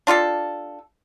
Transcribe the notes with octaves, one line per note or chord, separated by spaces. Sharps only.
D4 F4 G4 A4